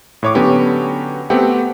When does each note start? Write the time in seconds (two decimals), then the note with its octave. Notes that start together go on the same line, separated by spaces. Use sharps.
0.23 A2 C#5 D6
0.35 D3 F#3 B3 C#4 F#4 G4
1.30 A3 B3 C4 G4 F#5